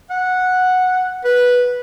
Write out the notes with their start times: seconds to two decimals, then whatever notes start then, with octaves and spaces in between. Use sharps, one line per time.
0.11 F#5
1.25 B4